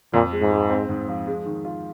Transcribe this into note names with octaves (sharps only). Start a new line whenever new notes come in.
F2 A#2
G#3
G#2
G#3
C4
G#2
F3
G#3
D#3
F4